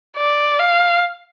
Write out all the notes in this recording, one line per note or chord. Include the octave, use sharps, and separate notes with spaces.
D5
F5